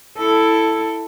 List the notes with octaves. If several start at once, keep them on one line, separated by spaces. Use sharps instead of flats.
E4 A4